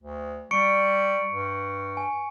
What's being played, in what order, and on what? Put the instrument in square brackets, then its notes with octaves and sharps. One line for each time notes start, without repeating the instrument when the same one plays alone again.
[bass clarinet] D2
[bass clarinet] G3 [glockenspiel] C#6 C#7 D7
[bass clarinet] G2
[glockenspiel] G#5